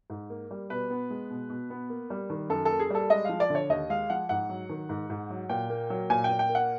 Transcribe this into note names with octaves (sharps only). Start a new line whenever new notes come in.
G#2
A#3
G3
B2 B4
B3
G#3
B2
B2
B3
A#3
G3
D#3
F#2 A4
A#3 A4
G#4
G3 A4
G#3 D#5
F3 F5
D5
D3 C#5
D#2 D#5
G#3 F5
F3 F#5
G#2 F#5
F#3
D#3
G#2
G#2
F#3
A#2 G5
A#3
F#3
A#2 G#5
G5
A#2
G5
A#3
F#5